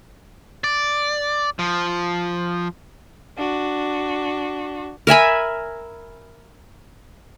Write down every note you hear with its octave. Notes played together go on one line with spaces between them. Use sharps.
D5
F3
D4 F#4
A#4 E5 G#5 B5